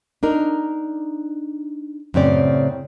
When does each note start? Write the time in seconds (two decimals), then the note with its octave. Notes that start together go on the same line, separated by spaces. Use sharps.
0.23 D4 D#4 A#4
2.14 F#2 A2 C#3 C4 C#4 D5